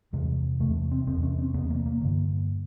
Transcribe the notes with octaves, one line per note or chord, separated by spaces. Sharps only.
E2 C3 G#3
E2 C3 A3
C4
E2 C3 C4
C#4
C4
E2 C3 B3
A#3
A#3
G2 D3